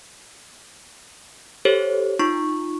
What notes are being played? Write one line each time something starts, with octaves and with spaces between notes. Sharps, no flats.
G4 A4 C5 C#5
D#4 F4 C#6